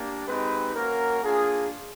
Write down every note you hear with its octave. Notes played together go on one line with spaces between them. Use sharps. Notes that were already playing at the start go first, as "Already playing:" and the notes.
Already playing: A#3 D4 G4
G#3 C4 D#4 G4 B4
A#3 C#4 F#4 A#4
A#3 D4 F4 G#4